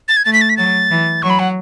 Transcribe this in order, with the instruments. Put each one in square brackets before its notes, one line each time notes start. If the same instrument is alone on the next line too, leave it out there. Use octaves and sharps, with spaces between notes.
[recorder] A6
G#6
[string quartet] A3 [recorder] A6
[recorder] B6
A6
B6
[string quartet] F#3 [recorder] A6
[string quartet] E3
[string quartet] F#3 [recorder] C#6
[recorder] B5
F#5